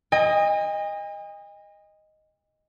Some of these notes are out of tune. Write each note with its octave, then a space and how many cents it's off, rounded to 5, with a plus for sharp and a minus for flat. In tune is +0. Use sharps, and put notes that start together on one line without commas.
D#5 +0 G#5 -45